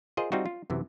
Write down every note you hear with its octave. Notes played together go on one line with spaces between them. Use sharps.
F4 G#4 A#4 C5 D#5
G3 C4 D#4 F4 F#4
F4
F#2 C3 E3